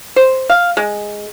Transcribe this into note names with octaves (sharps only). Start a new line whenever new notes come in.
C5
F5
G#3